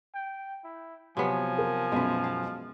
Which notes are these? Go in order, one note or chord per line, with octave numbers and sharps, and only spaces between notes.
G5
E4
C3 F3 F#3 B3 G#5
A#4
B1 F#2 G#3 B4
F5